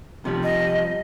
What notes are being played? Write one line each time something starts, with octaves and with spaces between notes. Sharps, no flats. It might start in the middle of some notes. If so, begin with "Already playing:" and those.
C3 F3 G3
D#5